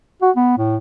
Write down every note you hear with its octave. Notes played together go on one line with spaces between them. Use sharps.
F#4
B3
A2